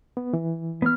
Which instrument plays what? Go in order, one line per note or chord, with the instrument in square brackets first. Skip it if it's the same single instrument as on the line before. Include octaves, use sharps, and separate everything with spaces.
[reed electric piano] B3
E3
[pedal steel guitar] B3 F6